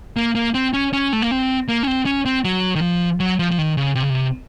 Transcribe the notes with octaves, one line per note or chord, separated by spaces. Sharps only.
A#3
A#3
C4
C#4
C#4
A3
A#3
C4
A#3
C#4
C4
C#4
C4
F#3
D#3
F3
F#3
F3
F3
D#3
C#3
C3
C#3
C3